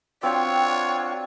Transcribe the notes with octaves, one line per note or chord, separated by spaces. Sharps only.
C4 D4 F4 F#4 C#5 G5